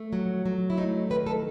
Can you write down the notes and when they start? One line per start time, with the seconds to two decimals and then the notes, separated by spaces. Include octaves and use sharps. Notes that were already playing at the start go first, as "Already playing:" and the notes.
Already playing: A3
0.13 F#3
0.46 F#3
0.70 E4
0.78 A3 D#4
1.10 D#3 B4
1.27 A4